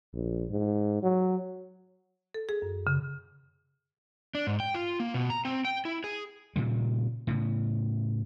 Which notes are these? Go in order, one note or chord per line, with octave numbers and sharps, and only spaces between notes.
A#1
G#2
F#3
A4
G#4
F#2
C#3
D4
G#2
G5
F4
A#3
B2
A#5
C4
G5
E4
G#4
A#2 C#3 G3
A2 C#3